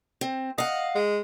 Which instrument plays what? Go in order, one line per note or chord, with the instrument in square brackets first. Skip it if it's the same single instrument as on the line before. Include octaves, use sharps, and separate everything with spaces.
[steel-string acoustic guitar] C4
[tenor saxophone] D#5 [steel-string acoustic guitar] F5 F#5
[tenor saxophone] G#3